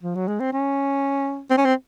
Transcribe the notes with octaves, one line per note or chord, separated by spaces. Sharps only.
F3
F#3
G#3
C4
C#4
C4
C#4
C4